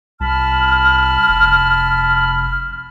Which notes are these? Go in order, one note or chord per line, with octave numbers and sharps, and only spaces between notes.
C2 A5 B5 F6
F1